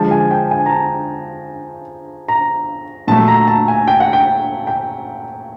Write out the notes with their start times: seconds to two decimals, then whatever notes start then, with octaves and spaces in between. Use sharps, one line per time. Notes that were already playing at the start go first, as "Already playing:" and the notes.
Already playing: D3 F3 G#3 A5
0.11 G#5
0.31 G5
0.51 G#5
0.66 A#5
0.70 A5
2.28 A#5
3.07 A#2 F#3 A3 A5
3.28 A#5
3.48 A5
3.68 G#5
3.88 G5
4.00 F#5
4.13 G5
4.67 G5